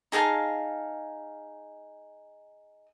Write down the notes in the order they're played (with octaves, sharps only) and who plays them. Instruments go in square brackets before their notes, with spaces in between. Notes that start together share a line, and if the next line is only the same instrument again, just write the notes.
[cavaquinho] D#4 G#4 F5 A5